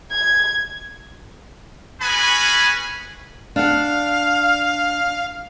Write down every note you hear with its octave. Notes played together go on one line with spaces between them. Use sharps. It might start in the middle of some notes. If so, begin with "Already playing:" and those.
G#6
C#4 F#4 G#4 B4 G#5 B5
D4 F5 F#5